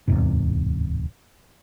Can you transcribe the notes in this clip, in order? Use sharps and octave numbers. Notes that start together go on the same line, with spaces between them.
D1 E2 G#2 C3